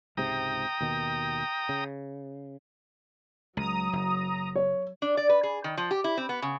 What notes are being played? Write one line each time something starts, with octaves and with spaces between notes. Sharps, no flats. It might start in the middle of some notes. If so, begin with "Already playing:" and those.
C#2 G#2 C3 G5 A#5 D#6
D#2 B2 D#3
C#3
C#2 F#3 A#5 D#6
F#1
C#5
D4
D5
B4
G#4
D#3
F3
G4
E4
C4
B3
C#3